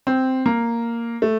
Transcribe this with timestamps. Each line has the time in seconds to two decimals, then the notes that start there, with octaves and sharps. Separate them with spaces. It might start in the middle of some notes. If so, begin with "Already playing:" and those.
0.07 C4
0.46 A#3
1.22 A3